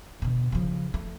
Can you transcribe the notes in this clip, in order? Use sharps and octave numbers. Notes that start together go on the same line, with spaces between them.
B2 D3
C#3 F3
A3